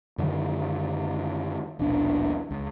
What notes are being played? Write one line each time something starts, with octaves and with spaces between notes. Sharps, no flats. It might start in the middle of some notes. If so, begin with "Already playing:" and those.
F#2 D3 D#3 F#3
D#1 A#1 B2 D4
C#2